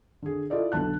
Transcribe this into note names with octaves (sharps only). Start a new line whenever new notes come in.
D3 G#4
E4 F4 A4 D5 D#5
B1 D3 A5 F#6